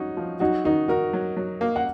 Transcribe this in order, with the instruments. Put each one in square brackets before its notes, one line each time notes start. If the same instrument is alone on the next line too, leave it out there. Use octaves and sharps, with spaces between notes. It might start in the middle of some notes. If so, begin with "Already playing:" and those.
Already playing: [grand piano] C#4 D#4 F#4
[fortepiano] F3
[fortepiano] F#3 [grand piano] D#4 F#4
[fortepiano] D#3 [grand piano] D#4 F#4
[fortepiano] D#3 [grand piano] F#4 A#4
[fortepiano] F#3
F#3
A#3
[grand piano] F#5